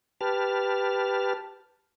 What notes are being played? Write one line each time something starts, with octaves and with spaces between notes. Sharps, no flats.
G4 B4 A5 F6